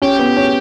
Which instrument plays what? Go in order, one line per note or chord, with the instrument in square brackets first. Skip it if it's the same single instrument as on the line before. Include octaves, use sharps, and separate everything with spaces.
[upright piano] C#4 [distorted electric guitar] G4
[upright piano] B3
C#4